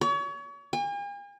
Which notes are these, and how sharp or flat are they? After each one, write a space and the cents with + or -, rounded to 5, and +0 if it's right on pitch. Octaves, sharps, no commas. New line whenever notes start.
C#5 +35
G#5 -45